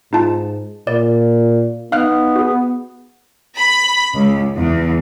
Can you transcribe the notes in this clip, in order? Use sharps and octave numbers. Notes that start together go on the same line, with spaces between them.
G#2 D#4 F4 A5
A#2 D5
B3 D#4 F5 F6 F#6
F#4 G#4
B5
C#2
E2